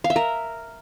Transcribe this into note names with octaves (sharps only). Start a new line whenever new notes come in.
F5
E5
A#4